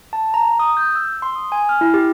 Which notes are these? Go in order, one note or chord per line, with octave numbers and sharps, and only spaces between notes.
A5
A#5
D#6
G6
E6
C6
D#6
G#5
F6
E4
G4